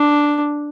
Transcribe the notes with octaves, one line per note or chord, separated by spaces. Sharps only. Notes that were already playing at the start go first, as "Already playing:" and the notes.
Already playing: D4